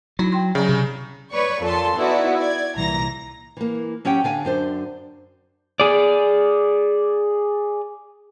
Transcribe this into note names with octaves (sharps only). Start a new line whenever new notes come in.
F#3 D#4 E4 A#5
G5 C6
C#3 F#3 D5 A#5
C3
B4 C#5 D5 C#6
F2 A#2 A4 A5 C6
B3 D#4 E4 F#4 A4 D5
D5 G#6
C2 A#2 E3 A#5 A#6
E3 A#3
F#3 C#4 G4 F#5 G5
D3 F5 G#5
F#2 D4 C5
G#4 D5